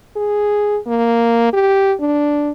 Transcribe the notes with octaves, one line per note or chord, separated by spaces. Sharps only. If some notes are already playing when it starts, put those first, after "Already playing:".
G#4
A#3
G4
D4